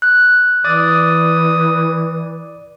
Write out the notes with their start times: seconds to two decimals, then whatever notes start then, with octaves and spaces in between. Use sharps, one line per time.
0.02 F#6
0.65 E3 D5 D#6